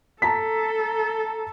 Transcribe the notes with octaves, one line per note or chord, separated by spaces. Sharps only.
A4 A5 A#5 B6